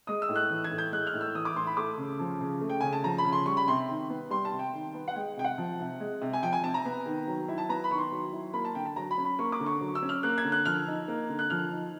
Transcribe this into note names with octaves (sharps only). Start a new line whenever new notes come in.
G#3 D#6
E6
A2
F#6
E3
G#6
A2
G6
G#3 F#6
F6
A2
E6
E3 D#6
D6
A2 C6
B5
A3 D6
C#3
F3
C#3
A3
G5
C#3 G#5
A5
F3 A#5
B5
C#3
C6
G3 C#6
B5
C3 C6
D#3
B3
G3 C6
A5
C3
G5
D#3
B3
F#5
G#3 G5
C3 G5
F#5
F3
C3
G#3
C3
G#5
F3 G5
G#5
C3 A5
A#5
B3
D#3
F#3
E4
A5
B3 A#5
B5
D#3 C#6
C6
F#3
E4
A#3 B5
A5
D3 G5
A5
F#3 A#5
B5
C#4
B5
A#3 C#6
D6
D3
C#6
F#3
E6
C#4
F6
A#3 F#6
G#6
D3
F#6
F3 F6
D#4
A#3
D3
F#6
F3 F6
D#4